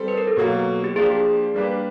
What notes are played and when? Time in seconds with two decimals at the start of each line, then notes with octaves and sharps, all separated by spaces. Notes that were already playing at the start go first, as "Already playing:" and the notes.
Already playing: G3 C4 A4
0.08 B4
0.17 A#4
0.28 A4
0.37 B2 F#3 A#3
0.84 G4
0.96 F3 A#3 D4 G4 G#4
1.54 G3 A#3 D4 G4 B4